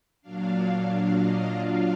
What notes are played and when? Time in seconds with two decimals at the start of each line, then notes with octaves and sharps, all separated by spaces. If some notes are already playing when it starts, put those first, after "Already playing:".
0.22 A#2 F#3 D4 F5
1.15 D#5
1.46 F#3 D4 F4 F5